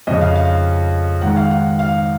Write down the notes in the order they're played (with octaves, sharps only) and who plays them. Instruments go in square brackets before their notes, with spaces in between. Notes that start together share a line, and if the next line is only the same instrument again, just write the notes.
[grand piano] F2 C#3 D#5
F5
F5
G#2 D#3 F#5
F5
F#5
F5